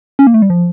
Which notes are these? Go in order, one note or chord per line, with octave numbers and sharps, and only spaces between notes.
C#4
A#3
A3
G3
F3